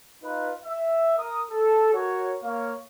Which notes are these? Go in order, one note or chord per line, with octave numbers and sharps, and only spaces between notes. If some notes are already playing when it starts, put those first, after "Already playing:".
D#4 F4 B4
E5
A#4 D#6
A4
F#4 A#4 C#5
A#3 C#5 F5